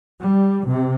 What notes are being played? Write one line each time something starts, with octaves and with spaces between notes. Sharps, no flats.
G3
C3